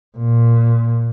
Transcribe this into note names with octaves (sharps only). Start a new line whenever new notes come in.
A#2